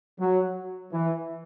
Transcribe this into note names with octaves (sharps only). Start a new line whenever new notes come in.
F#3
E3